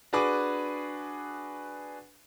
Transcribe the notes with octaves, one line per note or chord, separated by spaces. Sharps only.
D4 F#4 G#4 B4 G#5 D6